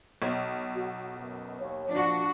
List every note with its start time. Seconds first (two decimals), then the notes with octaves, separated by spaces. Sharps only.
0.22 B1
0.75 F#4
1.18 F#2 B2
1.59 D#2 C#5
1.89 A#2 F3 D4 F#4